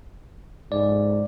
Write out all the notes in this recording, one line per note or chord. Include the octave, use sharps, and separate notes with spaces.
G#2 D5